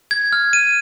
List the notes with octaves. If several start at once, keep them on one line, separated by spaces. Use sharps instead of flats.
G#6
F6
D#7